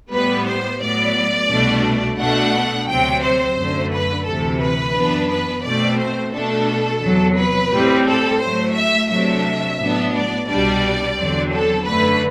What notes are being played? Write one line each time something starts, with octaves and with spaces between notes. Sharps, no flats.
A2 G3 B3 B4
C5
A2 F#3 B3 D5
C2 B2 A3 D4
B2 A3 D4 F#5
D2 C3 F#3 C4 G5
C5
F#2 D3 A3
B4
D2 C3 E3 A4
B4
F#2 E3 B3 D4
B4
B2 A3 C4 D5
C5
B2 A3 D4 A4
E2 C3 F#3
B4
A2 G3 C4
A4
A2 F#3 A3 C5
E5
C3 F#3 A3 D4 E5
A2 F#3 B3 D4
D5
C2 B2 G3 D4 D5
E2 D3 F#3 C4
A4
F#2 D3 A3 B4